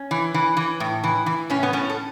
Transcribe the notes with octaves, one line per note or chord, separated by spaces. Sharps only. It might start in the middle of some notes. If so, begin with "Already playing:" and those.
Already playing: C#4
E3
E3
E3
A2
E3
E3
A2 C#4
B3
A2 C#4
A4